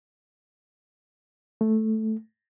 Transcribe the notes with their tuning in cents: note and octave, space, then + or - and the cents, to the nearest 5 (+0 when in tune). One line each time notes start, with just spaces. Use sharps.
A3 -5